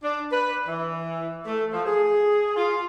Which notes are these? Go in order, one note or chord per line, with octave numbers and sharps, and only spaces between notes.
D4
B4
E3
A3
F3
G#4
F4